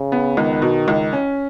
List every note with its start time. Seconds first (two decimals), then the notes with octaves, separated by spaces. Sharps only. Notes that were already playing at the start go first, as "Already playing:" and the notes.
Already playing: C#3
0.12 B3
0.37 C#2 D#3
0.62 B2
0.88 C#2
1.13 C#4